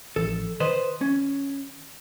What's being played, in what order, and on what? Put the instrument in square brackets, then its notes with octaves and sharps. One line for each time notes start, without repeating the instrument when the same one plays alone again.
[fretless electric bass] A1 E3 F3 [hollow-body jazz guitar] A4
[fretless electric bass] D#3 [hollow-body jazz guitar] B4 C5 D#5
[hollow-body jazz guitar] C#4